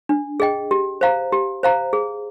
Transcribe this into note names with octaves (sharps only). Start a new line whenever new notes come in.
D4
G#4 D#5 G5
G4
C5 F5 A#5
G4
C5 F5 A#5
G#4